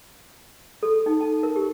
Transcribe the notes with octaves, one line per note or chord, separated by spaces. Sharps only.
A4
D#4
A5
A#4
G4